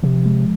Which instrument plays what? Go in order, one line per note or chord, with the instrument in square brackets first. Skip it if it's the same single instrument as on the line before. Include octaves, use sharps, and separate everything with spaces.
[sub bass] C3 [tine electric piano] F3
[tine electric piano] G#3